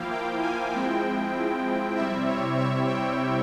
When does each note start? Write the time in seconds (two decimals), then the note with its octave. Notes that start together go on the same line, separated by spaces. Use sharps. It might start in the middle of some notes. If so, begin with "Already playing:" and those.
Already playing: F3 A#3 E4 F5 G5
0.11 G5
0.42 G#5
0.72 F3 G#3 C4 E4 G5
1.96 C3 G3 C4 E4 E5
2.27 C#5
2.58 E5
2.87 G5